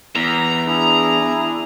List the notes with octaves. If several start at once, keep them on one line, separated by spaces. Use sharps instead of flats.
E2 A#5
D4 E4 G#4